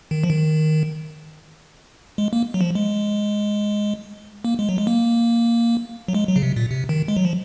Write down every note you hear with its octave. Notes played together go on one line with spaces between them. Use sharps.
D#3
F3
D#3
G#3
A#3
F#3
F3
G#3
A#3
G#3
F#3
G#3
A#3
F#3
G#3
F#3
C#3
C3
A#2
C3
D#3
G#3
F#3
F3